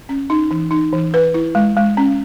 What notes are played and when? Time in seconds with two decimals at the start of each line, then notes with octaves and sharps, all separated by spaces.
0.09 C#4
0.30 D#4
0.51 E3
0.71 D#4
0.93 E3
1.14 B4
1.34 E4
1.55 G#3
1.77 G#3
1.97 C#4